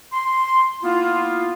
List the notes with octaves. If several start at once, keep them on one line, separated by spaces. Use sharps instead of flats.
C6
A#3 B3 E4 F4